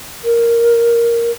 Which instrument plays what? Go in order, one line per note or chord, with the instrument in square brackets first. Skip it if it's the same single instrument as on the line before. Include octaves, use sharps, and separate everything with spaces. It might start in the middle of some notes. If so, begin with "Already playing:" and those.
[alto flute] A#4